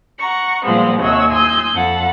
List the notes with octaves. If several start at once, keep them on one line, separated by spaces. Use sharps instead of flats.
F#5 A#5 C#6
A#2 F3 G3 G#3 B3 C4
D#2 C3 C#5 D#5 F#5 E6
G#5 C6 D#6 E6 G6
F2 A4 F#5